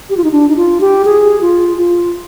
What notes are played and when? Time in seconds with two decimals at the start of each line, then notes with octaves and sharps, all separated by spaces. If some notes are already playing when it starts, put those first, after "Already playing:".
0.10 G4
0.17 F4
0.24 D#4
0.32 D4
0.49 D#4
0.56 F4
0.81 G4
1.05 G#4
1.41 F4
1.78 F4